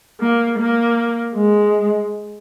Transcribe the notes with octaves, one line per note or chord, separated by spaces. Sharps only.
A#3
A#3
G#3